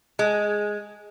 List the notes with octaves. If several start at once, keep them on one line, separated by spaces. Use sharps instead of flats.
G#3